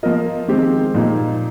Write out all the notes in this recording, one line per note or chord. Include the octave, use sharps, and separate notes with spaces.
F3 A#3 F4 A#4 D#5
D#3 G#3 C4 G4
A#2 F3 A#3 D#4